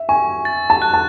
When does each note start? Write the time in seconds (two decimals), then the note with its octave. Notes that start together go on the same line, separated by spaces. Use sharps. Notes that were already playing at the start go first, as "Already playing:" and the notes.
Already playing: E5
0.09 G#5 C#6
0.45 A6
0.70 A5
0.82 F#6
0.94 A5